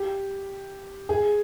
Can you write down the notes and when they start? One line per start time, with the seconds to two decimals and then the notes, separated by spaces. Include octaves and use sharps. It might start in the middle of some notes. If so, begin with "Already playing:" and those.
Already playing: G4
1.09 G#4